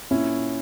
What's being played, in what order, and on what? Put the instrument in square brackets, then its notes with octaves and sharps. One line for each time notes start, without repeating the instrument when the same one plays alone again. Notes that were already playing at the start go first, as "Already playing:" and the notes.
[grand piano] A#2 C#4 E4